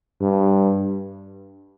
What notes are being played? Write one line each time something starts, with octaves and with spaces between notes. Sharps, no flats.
G2